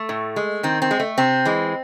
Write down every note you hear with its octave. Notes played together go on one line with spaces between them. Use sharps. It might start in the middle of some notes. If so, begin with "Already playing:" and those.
Already playing: A3
A2
G#3
D#3 C4
C4
G#3
A3
C3 C4
E3 G#3